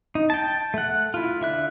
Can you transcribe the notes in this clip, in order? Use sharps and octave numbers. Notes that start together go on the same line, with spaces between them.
D#4
G5 A5
A3 F#5
E4 F4
D3 E5 F#6